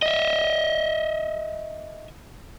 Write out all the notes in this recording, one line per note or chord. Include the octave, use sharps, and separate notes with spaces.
D#5 E5